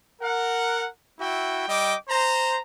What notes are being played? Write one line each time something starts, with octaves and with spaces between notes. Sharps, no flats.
A#4 F#5
E4 F#4 E5 G5
G3 D#5 G5 D6
C5 A#5